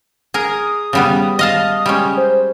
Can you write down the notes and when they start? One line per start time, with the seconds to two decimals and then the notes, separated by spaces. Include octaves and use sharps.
0.34 G#4 A#4 D#6
0.93 C#3 G3 B3
1.39 D#5 F5 A5
1.86 G3 G#3 C#4
2.17 C5